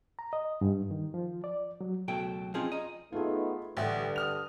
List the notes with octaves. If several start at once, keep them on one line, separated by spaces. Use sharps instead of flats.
A#5
D#5
G2
D#3
F3
D5
F#3
C#2 B2 F#3 A3 G5
F3 C4 C#4 D#4 F4 G#4
D#5 A#5
A3 B3 D#4 F4 G#4
A1 G2 D3 E5 F#5 G5
D#6 F6 F7